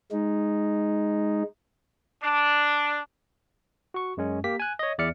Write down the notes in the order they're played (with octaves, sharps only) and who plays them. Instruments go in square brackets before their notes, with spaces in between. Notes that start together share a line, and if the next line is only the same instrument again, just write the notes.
[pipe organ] G#3 D#4
[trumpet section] D4
[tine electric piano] F#4 C#6
F#2 G#3 C#4
A#3 G4 B6
G#5 F#6
C#5 D#5
E2 D5 E5 F6 C#7